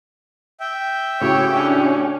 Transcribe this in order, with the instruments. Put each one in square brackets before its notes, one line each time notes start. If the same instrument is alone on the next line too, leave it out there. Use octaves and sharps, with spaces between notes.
[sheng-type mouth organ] E5 G5
[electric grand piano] A2 C#3 F#4 [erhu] G4 [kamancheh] C#5
[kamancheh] C#4 D4